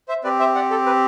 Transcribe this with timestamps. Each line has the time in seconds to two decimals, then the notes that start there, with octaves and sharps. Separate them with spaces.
0.08 C5 E5
0.24 C4 G4 B4 D5
0.39 C5 E5
0.55 D5 F#5
0.70 A4
0.86 B4